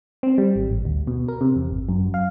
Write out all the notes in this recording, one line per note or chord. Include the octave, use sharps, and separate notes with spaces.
C4
G3
G#1
A1
D2
B2
A#4
C3
E2
G1
F#2
F5